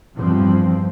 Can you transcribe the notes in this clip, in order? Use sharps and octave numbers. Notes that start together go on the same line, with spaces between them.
E2 G2 F3 G3 C4